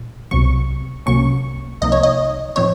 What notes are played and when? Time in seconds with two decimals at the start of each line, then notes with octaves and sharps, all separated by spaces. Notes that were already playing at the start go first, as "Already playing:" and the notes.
Already playing: A#2
0.31 C2 C3 F#3 C#6
1.06 C2 C3 F#3 A#3 C#4 C#6
1.81 C2 C3 F3 A#3 D#4 D#5
1.92 C#5
2.03 D#5
2.56 A2 F3 C4 D#4 C#5